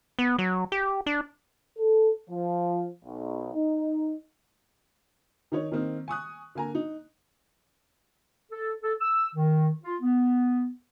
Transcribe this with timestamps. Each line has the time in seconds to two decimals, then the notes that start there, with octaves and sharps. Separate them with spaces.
0.19 B3
0.39 F#3
0.72 G4
1.06 D4
1.79 A4
2.30 F3
3.05 B1
3.54 D#4
5.52 D#3 D#4 C#5
5.72 D#3 A#3 C4 D#4 A#4
6.08 G#5 C#6 D#6 F#6
6.55 D3 A#3 G#5 A#5
6.75 D#4
8.51 A4
8.82 A4
9.01 E6
9.35 D#3
9.83 F4
10.02 B3